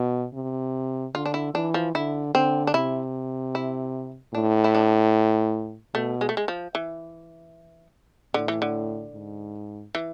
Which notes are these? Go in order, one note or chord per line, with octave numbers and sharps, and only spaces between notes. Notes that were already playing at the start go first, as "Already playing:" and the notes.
Already playing: B2
C3
D3 F4
D4
E4
E3 D4
F3
D3 E4
D3 C4
D4
C3 E4
E4
A2 D4
E4
D4
B2 A3
G#3
A3
G#3
F3
E3
A2 D3
E3
D3
G#2
E3